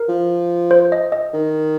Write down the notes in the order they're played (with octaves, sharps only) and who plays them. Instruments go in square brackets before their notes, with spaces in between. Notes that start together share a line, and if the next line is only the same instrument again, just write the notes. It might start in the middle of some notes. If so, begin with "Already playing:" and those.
Already playing: [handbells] A#4
[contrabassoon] F3
[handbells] C5
D#5
D#5
[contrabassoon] D#3